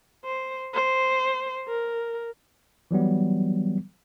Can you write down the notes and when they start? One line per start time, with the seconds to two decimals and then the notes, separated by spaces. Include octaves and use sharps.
0.25 C5
0.74 C5
1.68 A#4
2.91 E3 F#3 G3 B3